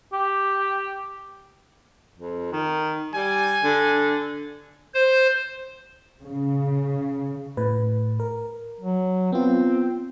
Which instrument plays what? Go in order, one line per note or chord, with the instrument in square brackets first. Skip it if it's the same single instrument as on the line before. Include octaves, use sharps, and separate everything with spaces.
[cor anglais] G4
[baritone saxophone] F2
D#3
[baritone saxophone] G3 [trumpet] G#5
[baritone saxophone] D3
[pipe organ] C5
[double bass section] C#3
[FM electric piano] A2 B4
A#4
[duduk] F#3
[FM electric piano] B3 F4 [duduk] C4